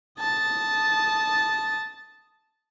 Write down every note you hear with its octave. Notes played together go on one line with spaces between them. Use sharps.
A5 D#6